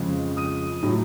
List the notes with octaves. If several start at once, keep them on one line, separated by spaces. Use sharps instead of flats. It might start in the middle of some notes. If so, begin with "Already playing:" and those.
Already playing: F2 C#3 F3 G#3
D#6 D#7
A2 F#3